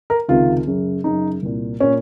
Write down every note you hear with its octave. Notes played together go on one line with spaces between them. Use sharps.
A#4
C#2 C3 D#3 F4
F#2 C#3
F#2 C#3 D#4
C2 A#2
A#2 C#4